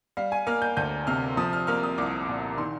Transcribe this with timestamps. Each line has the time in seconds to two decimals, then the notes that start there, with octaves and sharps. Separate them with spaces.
0.17 G3 F5
0.32 G#5
0.47 A#3 F6
0.62 G6
0.77 D2 G6
1.07 C3 F6
1.37 F3 D#6
1.53 F6
1.67 A#3 F6
1.83 D#6
1.98 C2 D6
2.28 A#2
2.58 D#3 C6